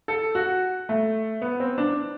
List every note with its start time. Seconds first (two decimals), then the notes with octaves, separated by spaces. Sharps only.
0.08 A4
0.35 F#4
0.89 A3
1.42 B3
1.60 C4
1.78 D4